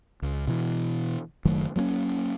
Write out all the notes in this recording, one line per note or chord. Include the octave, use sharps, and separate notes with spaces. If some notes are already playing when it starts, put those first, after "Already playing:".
C#2
B2 E3
F#1 D#3 F#3 A3
F#3 A#3 B3 C#4